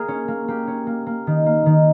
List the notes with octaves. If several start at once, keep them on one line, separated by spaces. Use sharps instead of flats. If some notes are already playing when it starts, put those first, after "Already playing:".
Already playing: A#3 G#4 A#4
C#4
A#3
A#3 G4
C#4
A#3
A#3
D#3
A#3
D#3